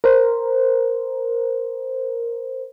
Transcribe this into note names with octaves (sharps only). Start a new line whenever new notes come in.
A#4 C5